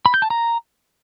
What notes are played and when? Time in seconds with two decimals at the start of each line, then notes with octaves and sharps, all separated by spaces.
0.06 B5
0.14 G6
0.22 A5
0.30 A#5